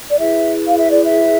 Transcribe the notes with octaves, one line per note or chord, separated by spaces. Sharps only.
D5
E4 G#4 B4 E5
F5
E5
D5
E5